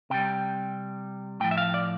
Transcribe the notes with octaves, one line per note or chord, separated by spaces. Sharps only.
C3 G3 G5
A2 F3 G5
E5
F5
D5